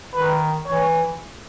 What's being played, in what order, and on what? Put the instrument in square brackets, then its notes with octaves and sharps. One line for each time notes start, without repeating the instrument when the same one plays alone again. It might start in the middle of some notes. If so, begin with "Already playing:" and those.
[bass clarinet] D#3 [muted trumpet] B4
[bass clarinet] E3 [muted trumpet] C#5